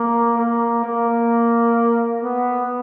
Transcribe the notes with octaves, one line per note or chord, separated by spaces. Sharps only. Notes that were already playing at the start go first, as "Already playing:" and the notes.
Already playing: A#3
A#3
A#3
B3